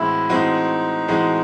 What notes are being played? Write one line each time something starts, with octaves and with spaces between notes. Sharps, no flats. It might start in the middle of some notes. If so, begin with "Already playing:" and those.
Already playing: A2 E3 G#3 C4 E4 F#4
A2 E3 G#3 C4 D#4 F#4
A2 E3 G#3 C4 F#4